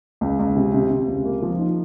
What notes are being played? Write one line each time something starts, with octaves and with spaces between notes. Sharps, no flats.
C#2
C#2
C3
C3
C3
C#2
A#3
F3
D#4